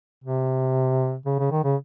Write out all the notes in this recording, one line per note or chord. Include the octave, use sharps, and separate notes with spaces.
C3
C#3
C#3
D#3
C#3